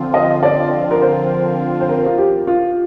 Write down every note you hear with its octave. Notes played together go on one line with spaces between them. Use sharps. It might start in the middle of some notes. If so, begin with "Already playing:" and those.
Already playing: D3 F3 C4 F4
D#5
D5
A#4
C5
C5
A#4
F4
G4
F4